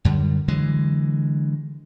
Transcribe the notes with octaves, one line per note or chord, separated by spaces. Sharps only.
F#2 D3 G3
D3 E3 F#3 G#3